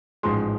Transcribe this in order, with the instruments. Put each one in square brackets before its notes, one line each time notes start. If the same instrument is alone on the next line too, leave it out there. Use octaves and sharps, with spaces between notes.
[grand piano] A1 G#2 F3 G#3 C6